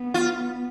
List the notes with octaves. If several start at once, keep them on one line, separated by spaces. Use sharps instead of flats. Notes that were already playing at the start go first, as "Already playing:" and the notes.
Already playing: B3
F4